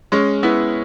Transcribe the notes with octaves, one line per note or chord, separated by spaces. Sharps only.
G#3 C#4
B3 E4